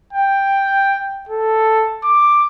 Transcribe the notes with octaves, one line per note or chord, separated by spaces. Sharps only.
G5
A4
D6